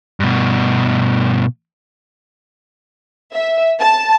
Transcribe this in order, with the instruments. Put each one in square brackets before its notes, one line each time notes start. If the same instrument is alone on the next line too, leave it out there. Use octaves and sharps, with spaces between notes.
[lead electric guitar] G2 B2
[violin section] E5
A5